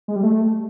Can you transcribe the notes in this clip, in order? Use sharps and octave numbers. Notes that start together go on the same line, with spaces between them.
G#3
G3
A3